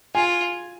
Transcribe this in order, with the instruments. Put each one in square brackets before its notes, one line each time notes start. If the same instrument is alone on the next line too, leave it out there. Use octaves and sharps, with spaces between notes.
[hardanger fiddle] F4 [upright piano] G#5